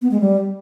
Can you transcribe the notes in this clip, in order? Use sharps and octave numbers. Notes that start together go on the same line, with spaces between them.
B3
G#3
G3